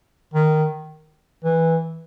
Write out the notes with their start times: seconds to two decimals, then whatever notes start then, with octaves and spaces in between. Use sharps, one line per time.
0.34 D#3
1.44 E3